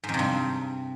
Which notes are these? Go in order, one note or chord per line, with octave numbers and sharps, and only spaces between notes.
G#2
F2
C3
G2